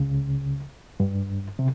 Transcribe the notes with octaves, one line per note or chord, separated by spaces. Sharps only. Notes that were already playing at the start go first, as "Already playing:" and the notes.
Already playing: C#2 C#3
G2
C3